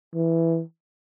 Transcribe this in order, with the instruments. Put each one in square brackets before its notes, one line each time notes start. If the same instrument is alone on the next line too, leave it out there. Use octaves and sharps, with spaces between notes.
[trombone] E3